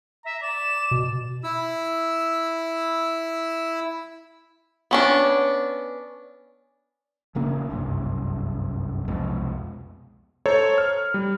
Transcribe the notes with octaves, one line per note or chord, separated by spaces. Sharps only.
E5 A#5
D5 E7
B2
E4 E6
B3 C#4 D4
E1 C#3 A#3 D4
G1 C2 F#2
C2 F2 B2 G#3
A4 C5 C#5 A#5
F6
G3